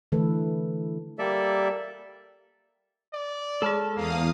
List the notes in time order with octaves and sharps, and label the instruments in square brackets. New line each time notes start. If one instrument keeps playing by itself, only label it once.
[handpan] D3 E3 A3 A4 B4
[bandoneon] G3 A#3 A4 D5 E5
[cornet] D5
[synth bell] G#3 G#4 [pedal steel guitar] A4 A5 F6
[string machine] E2 F5 D#6 [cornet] A#3